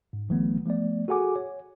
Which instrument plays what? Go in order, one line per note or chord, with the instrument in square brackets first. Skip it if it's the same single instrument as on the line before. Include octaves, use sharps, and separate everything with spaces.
[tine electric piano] G#2
B1 D3 E3 F#3 A3 B3
F3 A3 B3 D5
F#4 G#4 A4 F#5 G#5 D6
C#5